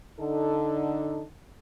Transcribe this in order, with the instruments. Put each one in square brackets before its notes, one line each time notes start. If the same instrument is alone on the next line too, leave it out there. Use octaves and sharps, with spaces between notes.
[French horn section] D3 D#4 A4